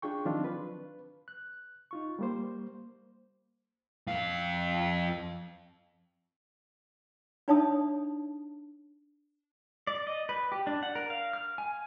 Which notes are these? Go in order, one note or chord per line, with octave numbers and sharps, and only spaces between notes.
D4 F4 G#4 G5 C#6
D#3 F3 F#3 C4 D4 F4
B4
F#6
D#4 F4 C#6
G3 A#3 C5
F2 F5
D4 D#4 C#5 E5 A5 D#6
D5
D#5
B4
G4
D4
F#5
A#4
F5
F6
G#5